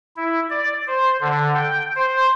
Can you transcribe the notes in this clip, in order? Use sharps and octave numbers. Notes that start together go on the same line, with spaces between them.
E4
D5
C5
D3
G5
C5